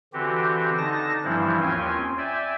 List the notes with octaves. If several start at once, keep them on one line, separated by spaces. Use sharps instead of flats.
D3 E3 C4 F#4 G4
D3 D#4 A5 A#6
G2 E3 F3 G3 C4 E4
D#2 C4 C#4 F4 G5 G#5
D5 E5 G5 G#5